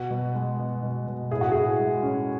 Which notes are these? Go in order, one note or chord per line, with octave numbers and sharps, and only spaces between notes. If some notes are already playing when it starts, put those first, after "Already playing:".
Already playing: B2 F#4
B2
G#3
B3
B2
B2
A2 G#4
F#4
A2 G#4
G#3
C#4